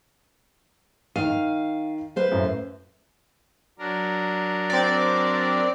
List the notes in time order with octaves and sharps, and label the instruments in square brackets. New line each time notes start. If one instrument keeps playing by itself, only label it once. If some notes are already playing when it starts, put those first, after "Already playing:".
[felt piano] D#3 D#7 [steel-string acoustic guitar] F5
[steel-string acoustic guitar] B4 C5 F5
[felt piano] F#2 A2
[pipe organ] F#3 D4 A#4
[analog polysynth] C4 D5